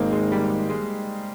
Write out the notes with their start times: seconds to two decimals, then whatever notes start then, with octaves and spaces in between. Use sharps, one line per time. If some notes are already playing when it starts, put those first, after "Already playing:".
Already playing: G#1 G#2 D#3 A#3 C4 D#4
0.12 G#3
0.32 G3
0.69 G#3